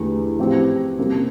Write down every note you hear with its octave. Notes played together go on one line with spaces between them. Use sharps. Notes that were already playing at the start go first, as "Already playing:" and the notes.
Already playing: E2 D3 A3 E4 G4
A2 F3 C4 G4
C3 G3 A#3